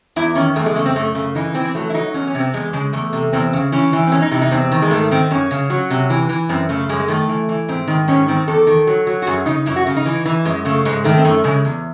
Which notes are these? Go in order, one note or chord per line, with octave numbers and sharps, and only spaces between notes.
E2 E4
D#3 C#4
E2 A3
G#3
C#3 A3
C4
F#2 A3
C#3 A3
E3 D#4
E3 C4
C4
F#3 A3
E4
F#3 D#4
E2 C#4
C#4
C3
C4
E2 G#3
C#3 G#3
E2 A3
C3
E2 C4
C#3
E3 C#4
E3
C4
E2 C#4
D#4
C3 E4
D#4
E2 C4
D#3
G#3
G#2 A3
D#3 C4
F#2 C#4
C#3
F#3
C3
E3
E3
F#2 C4
C#3 A3
F#2 G#3
G#3
D#3 A3
E3
E3
G#2 C4
D#3
G#2 C#4
D#3 C4
E2 A4
D#3
F#3
F#3
F#4
F#2 G#4
C#3 D#4
F#2 E4
F#4
C#3
D#4
E3
E3
F#2 G#3
C#3 A3
G#2 G#3
D#3 A3
C4
F#2 A3
C#3 G#3
E2